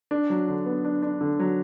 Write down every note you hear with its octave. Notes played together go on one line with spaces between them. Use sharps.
D4
F#3
D3
B3
D4
D4
D3
F#3